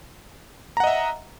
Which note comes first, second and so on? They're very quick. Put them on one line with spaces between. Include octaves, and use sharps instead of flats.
A#5 F#5 D#5 E5